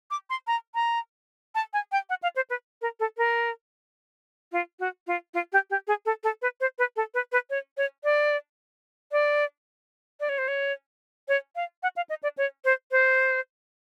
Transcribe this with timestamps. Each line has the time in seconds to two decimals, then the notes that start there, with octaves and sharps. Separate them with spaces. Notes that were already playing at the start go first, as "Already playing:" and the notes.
0.11 D6
0.30 C6
0.47 A#5
0.75 A#5
1.55 A5
1.73 G#5
1.92 G5
2.09 F#5
2.23 F5
2.36 C5
2.50 B4
2.82 A#4
3.00 A4
3.18 A#4
4.52 F4
4.79 F#4
5.07 F4
5.34 F4
5.52 G4
5.70 G4
5.87 G#4
6.06 A4
6.24 A4
6.42 B4
6.60 C5
6.79 B4
6.96 A4
7.14 B4
7.32 B4
7.50 C#5
7.77 C#5
8.04 D5
9.12 D5
10.20 D5
10.29 C#5
10.38 C5
10.48 C#5
11.28 C#5
11.56 F5
11.83 F#5
11.96 F5
12.09 D#5
12.23 D5
12.38 C#5
12.65 C5
12.91 C5